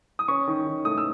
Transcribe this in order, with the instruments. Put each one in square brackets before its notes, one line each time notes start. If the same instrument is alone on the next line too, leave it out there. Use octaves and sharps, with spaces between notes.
[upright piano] D#6
C#4 C#6
D#3
D#3
A3 D#6
E6